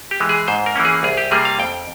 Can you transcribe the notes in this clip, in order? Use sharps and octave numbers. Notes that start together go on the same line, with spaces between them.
G4
E3 G#3
G#4
G#2 C5
A#4
E3 A#3 C#4
G#4
C2 G#4
G4
C3 G3 A#3 G#4
F5
F2 G5